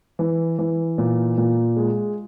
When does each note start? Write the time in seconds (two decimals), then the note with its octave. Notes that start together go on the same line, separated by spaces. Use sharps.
0.19 E3
0.59 E3
0.98 A#2
1.37 A#2
1.77 G#3